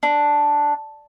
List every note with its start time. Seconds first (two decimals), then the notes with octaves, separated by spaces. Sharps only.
0.03 D4